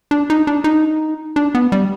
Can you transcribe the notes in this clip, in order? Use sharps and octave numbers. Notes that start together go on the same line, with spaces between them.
D4
D#4
D4
D#4
D4
B3
G3